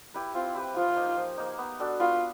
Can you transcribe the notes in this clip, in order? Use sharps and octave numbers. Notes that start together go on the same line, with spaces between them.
E4 G4 B4
C4 F4
E4 G4 B4
F3 F4
A#3 D#4
F3
A#3 D#4
B3
D4 F#4 A4
B3 F4